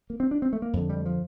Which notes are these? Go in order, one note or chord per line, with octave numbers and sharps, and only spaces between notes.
A#3
C4
D4
C4
A3
A#3
F2 D3
G3
F3